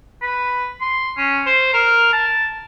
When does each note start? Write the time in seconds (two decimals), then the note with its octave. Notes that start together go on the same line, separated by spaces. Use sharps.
0.22 B4
0.81 C6
1.18 C#4
1.46 C5
1.73 A#4
2.13 A5